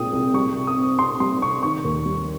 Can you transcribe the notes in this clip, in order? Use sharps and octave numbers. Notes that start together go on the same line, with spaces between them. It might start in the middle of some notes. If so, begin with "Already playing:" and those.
Already playing: C2 A#2 G#3 C4 G5 D#6
C2
G3 C#6
C3
D#6
C4
C3 C6
G3 C6
C3 C#6
D#3 C#6
D#2
G3